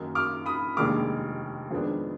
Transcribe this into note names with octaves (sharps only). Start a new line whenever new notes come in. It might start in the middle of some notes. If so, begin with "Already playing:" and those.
Already playing: F#2 D#3 A#3 D#4
D6 F6
B5 D#6
F1 D#2 D#3 G#3 D4 D6 F6
F2 D#3 G#3 B3 D4